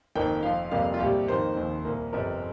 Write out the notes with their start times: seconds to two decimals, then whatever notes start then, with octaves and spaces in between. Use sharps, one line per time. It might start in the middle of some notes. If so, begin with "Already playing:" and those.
0.16 F1 F2 D#3 A#3 G5
0.43 F1 F2 F3 F5
0.71 F1 F2 C3 G3 A#3 F5
0.94 F4
1.00 C2 A#2 G3 G4
1.28 F2 D#3 A#3 C5
1.57 F1 D#2 D#3
1.85 C2 A#2 A#3
2.12 G1 F2 C3 A#4